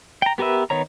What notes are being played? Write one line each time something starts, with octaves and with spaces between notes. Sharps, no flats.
G5 A#5
B3 G4 A#4 B4 E5
D#3 B3 C#5 A#5